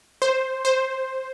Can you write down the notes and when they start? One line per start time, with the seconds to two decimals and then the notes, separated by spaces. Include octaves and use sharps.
0.22 C5
0.65 C5